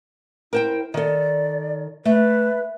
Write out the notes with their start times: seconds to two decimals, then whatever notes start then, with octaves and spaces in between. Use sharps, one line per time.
0.53 E4 A#4 C5 G5
0.94 D#3 A4 D5
2.05 A3 B4